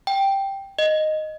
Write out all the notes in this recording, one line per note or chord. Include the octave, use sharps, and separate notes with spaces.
G5
D#5